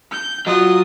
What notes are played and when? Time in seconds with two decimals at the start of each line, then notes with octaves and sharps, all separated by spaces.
0.11 G6
0.47 F#3 F4 D#6